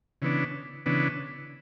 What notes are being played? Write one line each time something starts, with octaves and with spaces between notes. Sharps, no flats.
C#3 E3 B3 D4
C#3 E3 B3 D4